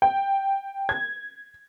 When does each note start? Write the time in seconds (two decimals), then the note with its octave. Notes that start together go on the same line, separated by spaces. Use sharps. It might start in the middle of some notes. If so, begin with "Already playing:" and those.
0.02 G5
0.89 G#6